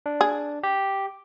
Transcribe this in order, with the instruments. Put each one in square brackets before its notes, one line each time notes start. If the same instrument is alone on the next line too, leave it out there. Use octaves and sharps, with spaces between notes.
[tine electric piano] D4
[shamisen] G#4
[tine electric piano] G4